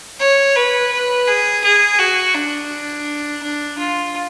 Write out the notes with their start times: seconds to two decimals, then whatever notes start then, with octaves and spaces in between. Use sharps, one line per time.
0.20 C#5
0.56 B4
0.92 B4
1.28 G#4
1.64 G#4
1.99 F#4
2.35 D4
3.43 D4
3.78 F4